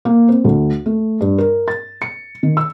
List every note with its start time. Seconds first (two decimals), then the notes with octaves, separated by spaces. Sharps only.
0.05 A#3
0.29 C4
0.44 D2
0.86 A3
1.21 G2
1.38 A#4
1.68 A6
2.02 C#7
2.43 D#3
2.57 E6